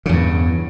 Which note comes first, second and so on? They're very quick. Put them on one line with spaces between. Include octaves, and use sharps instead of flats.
C#3 E2 G2